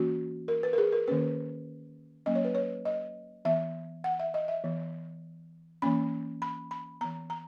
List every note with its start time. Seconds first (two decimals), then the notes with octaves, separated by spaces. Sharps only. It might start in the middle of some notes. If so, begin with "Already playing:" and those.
Already playing: E3 A#3 C#4 F#4
0.48 A#4
0.63 B4
0.73 A#4
0.78 G#4
0.93 A#4
1.08 D#3 A#3 C#4 B4
2.26 F#3 A#3 C#4 D#5
2.35 C#5
2.45 B4
2.55 C#5
2.85 D#5
3.45 E3 B3 E5
4.04 F#5
4.20 E5
4.34 D#5
4.48 E5
4.64 E3 B3
5.82 E3 A#3 C#4 B5
6.42 B5
6.71 B5
7.01 E3 B3 A#5
7.30 A#5